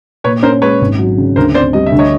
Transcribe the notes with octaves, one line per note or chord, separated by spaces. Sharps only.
A#2 B4 C#5
C#4 A#4 C5
G#3 B4 C#5
G#1
F#3
C#3
D2 A#4 C5
C4 C5 D5
G3 D#5
E5
D2
C#5 D#5